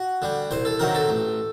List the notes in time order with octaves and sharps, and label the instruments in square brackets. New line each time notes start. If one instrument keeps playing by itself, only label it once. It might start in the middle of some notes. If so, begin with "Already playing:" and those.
Already playing: [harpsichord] F#4
D3 G3
C2 C5
A4
C3 D#3 F#3 A#4
A4
A1